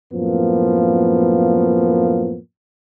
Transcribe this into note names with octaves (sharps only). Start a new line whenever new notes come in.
F#2 A2 F3 A#3 B3